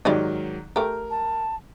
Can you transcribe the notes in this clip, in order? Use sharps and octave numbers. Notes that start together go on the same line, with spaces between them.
G#2 D#3 F#3 G4 D5 D#5
A3 G4 A#4
A5